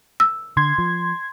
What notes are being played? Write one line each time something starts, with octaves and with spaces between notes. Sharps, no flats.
E6
D3 C6 G#6
F3